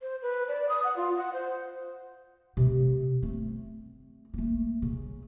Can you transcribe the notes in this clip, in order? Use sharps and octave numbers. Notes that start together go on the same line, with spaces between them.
C5
B4
D5
D#6
F#5
F4
F#5
C5
C3 A3
A3 C4
A3 A#3
C#3